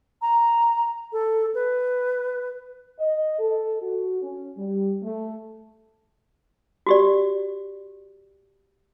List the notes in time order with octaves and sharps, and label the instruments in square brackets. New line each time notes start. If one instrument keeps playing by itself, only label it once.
[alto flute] A#5
A4
B4
[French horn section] D#5
A4
F#4
C#4
G3
A3
[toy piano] F#4 G4 D5